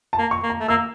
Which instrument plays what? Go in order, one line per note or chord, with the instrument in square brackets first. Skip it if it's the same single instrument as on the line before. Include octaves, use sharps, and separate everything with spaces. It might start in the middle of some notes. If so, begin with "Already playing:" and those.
[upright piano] A5
[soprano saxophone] A#3
[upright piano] C#6
[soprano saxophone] A#3
[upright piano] A#5
[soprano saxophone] A3
[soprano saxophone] A#3 [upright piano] E6